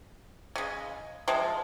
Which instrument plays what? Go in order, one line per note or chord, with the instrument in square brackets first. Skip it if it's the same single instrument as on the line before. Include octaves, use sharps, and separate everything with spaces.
[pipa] C#3 G#3
C3 F3 G#3